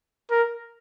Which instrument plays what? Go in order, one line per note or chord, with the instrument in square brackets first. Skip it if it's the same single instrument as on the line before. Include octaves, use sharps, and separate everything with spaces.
[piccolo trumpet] A#4